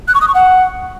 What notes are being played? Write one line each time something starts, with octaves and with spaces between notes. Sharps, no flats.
F#6
C#6
D#6
C#6
F#5